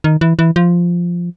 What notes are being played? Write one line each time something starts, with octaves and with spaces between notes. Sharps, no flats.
D#3
E3
E3
F3